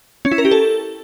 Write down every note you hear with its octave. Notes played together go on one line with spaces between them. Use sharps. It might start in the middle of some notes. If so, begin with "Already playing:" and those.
C#4
E4
A#4
G4
A4